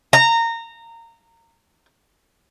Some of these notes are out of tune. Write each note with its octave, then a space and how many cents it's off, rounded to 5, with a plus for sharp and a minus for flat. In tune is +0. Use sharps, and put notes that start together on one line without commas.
A#5 -20